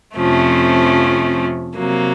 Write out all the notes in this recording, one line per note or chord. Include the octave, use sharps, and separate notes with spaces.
F2 C3 F3 A3 C#4
C3 F#3 A#3